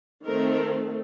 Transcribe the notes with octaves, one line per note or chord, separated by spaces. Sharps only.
D#3 A3 C4 A#4